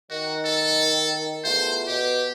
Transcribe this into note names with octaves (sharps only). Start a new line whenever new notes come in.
D#3 F#4
A4
E2 A3 F4 C5
B2 G4